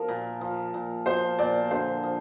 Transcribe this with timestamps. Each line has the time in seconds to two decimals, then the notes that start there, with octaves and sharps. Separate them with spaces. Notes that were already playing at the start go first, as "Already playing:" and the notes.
Already playing: F3 A#4
0.08 A#2
0.41 F3
0.74 A#2
1.06 F3 C5
1.39 A#2 D5
1.71 D3 C5
2.03 F3